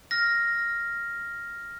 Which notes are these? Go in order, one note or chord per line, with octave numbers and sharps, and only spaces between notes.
F6 A#6